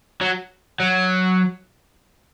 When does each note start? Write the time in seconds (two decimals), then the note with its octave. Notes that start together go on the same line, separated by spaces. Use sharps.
0.21 F#3
0.80 F#3